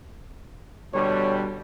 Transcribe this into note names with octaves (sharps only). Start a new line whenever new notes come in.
B2 D3 G3 C#5